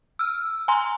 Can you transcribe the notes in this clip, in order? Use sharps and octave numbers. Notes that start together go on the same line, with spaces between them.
E6 F6
G#5 A#5 C6